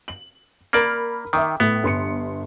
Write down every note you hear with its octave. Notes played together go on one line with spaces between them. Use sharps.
F#7
A#3 A#4 D5 B5 F6
D#3 E5 G5 D6
A2 B3
G1 C6 C#7